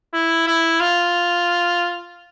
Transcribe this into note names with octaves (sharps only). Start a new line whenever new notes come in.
E4
E4
F4